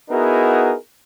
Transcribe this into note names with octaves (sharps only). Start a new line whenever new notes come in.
B3 D#4 E4 F#4 G#4 A#4